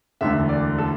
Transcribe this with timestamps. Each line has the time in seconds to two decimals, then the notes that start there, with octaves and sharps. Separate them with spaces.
0.21 E1 D2 D3 E5
0.49 D5
0.78 A4